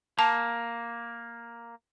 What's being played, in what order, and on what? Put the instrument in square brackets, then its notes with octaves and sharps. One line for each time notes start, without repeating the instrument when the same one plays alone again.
[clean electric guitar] A#3 [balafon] A5